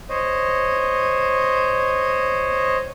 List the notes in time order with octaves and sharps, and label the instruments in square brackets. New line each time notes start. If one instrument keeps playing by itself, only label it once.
[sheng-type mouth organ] C5 C#5 D#5